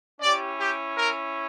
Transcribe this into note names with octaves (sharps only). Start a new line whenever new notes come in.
C#4 E4 G4 D5
G4
A#4